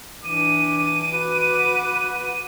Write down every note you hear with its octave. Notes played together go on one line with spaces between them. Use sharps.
E3 D4 D6 D#7
F#4 B4